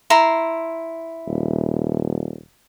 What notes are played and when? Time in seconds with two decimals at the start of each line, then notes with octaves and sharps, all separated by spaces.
0.10 E4 A#5 C6
1.28 D#1